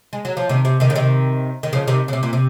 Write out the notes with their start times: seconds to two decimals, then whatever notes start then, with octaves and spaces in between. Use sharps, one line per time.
0.13 G#3
0.25 F#3
0.37 F3
0.49 C3 D#3
0.65 C3
0.80 C3 D#3
0.90 C#3
0.95 C3 D#3
1.63 D#3
1.73 C#3 F3
1.88 C3 D#3
2.08 C#3
2.13 C3
2.23 A#2
2.33 C3